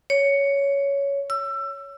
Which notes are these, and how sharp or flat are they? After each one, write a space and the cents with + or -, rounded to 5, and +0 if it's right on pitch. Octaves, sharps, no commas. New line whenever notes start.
C#5 +10
E6 +25